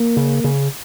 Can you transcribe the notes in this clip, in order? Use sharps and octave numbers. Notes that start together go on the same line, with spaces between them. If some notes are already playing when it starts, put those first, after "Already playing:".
Already playing: A#3
C#3
C#3